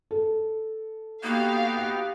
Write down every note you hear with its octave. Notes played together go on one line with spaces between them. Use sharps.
A4
A#3 B3 D#4 F#4 G4 F5